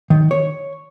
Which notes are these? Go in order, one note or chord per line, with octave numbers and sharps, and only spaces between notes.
D#3
C#5